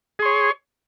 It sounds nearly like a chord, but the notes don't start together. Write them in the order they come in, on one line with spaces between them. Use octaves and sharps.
G#4 C6 C#5